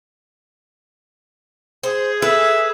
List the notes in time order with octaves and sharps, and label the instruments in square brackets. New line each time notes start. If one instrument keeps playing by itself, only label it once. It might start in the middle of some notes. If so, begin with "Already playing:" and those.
[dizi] G#4 [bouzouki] C5
[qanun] A4 [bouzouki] B4 [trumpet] E5